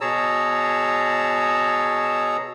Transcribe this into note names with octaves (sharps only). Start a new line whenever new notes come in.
B2 G#4 C#5 A5 A#5 E6